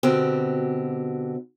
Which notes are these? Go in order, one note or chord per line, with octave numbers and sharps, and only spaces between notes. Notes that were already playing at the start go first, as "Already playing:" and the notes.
B2 D3 C4 F#4 G4